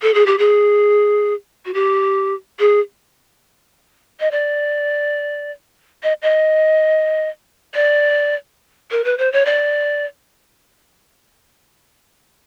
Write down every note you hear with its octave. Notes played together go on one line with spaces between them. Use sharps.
A4
G#4
G4
G#4
F#4
G4
G#4
D#5
D5
D#5
D#5
D5
A#4
B4
C5
C#5
D5